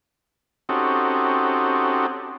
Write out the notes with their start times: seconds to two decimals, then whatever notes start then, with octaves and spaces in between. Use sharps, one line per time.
0.69 C4 C#4 D#4 F#4 G4 A4